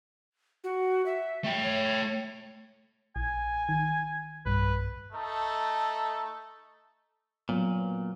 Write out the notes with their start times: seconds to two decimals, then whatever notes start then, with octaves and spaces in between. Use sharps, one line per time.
0.64 F#4
1.06 E5
1.44 A3 G5
1.62 C#5
3.16 A#1 G#5
3.69 D#3
4.46 B1 G2 B4
5.12 A3 D#4 A4
7.49 A#2 F#3 B3